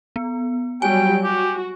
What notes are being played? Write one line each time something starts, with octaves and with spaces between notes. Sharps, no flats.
B3
F#3 G3 G5 G#5
F#4 G4